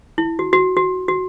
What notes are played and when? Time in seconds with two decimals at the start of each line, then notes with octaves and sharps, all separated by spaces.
0.18 E4
0.39 F#4
0.53 F#4
0.77 F#4
1.08 F#4